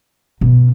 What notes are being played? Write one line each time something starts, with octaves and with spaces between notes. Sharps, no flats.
B2